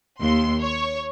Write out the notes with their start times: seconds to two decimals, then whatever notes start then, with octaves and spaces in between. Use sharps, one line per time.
0.20 D#2 C6
0.61 C#5 C#6